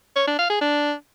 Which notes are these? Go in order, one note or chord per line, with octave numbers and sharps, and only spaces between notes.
C#5
D4
F5
G#4
D4